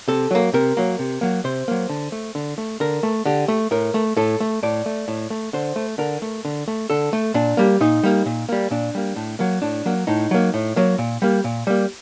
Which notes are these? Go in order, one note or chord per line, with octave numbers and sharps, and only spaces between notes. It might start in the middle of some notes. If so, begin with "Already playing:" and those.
C3 A4
F#3 A#3
C3 A#4
F#3 A#3
C3
F#3 A#3
C3 C5
F#3 A#3
D3
A3
D3
A3
D3 A#4
A3
D3 G4
A3
A2 A#4
A3
A2 A4
A3
A2 D5
A3
A2
A3
D3 C5
A3
D3 A#4
A3
D3
A3
D3 A4
A3
A#2 D4
G3 A#3
A#2 D#4
G3 A#3
A#2
G3 A#3
A#2 D4
G3 A#3
A2
F#3 A#3
A2 D4
F#3 A#3
A2 D#4
F#3 A#3
A2
F#3 A#3
A#2
G3 A#3
A#2
G3 A#3